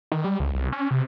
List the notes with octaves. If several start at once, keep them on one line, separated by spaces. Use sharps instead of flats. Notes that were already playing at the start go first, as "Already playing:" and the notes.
D#3
G3
C#2
C2
C#4
C3